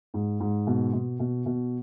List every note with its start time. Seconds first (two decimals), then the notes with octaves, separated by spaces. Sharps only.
0.14 G#2
0.40 G#2
0.67 B2
0.93 B2
1.20 B2
1.46 B2